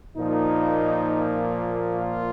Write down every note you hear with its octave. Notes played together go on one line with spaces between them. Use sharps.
A#2 F3 A#3 D#4
F4